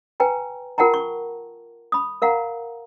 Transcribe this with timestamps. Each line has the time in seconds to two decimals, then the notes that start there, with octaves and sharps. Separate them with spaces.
0.20 B4 G5 G#5 A#5
0.78 F4 A#4 F#5 G5 A5 A#5
0.94 C#6
1.92 B5 D#6
2.22 A#4 F5 F#5 A#5